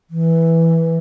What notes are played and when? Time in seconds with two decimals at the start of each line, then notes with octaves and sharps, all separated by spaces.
0.10 E3